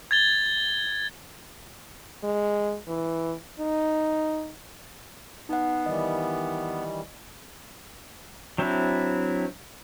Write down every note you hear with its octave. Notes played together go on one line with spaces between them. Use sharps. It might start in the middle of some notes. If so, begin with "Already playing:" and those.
G#6 A6 G7
G#3
E3
D#4
B3 D#4 F#5
D#3 E3 G3 D#5
F#3 C4 D4 E4